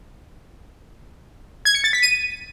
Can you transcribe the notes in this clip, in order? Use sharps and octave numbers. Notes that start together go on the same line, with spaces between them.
G#6
C#7
A6
B6
D#7